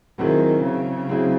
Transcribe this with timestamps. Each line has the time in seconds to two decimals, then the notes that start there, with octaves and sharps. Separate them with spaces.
0.18 D#3 F#3 C4 E4 G#4
0.63 C#3
1.09 F#3 C4 E4 G#4